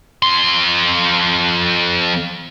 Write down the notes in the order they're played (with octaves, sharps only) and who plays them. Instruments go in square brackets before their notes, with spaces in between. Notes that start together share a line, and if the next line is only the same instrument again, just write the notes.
[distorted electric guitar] F2 C6